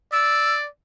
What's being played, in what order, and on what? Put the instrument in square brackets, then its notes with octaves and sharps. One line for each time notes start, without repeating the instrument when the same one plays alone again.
[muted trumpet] D5 [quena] E6